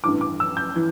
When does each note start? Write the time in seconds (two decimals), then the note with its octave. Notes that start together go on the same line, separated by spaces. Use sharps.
0.04 A1 G2 E3 D6
0.21 D6
0.40 E6
0.57 G6
0.76 E3